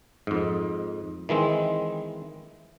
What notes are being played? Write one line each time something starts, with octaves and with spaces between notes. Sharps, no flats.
F2 G#2
D#3 E3 G#3 C4